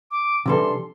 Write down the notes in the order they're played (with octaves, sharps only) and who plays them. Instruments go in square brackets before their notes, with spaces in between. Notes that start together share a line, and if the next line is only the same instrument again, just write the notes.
[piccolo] D6
[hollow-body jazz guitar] C3 E3 G3 D4 A4 [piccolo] C6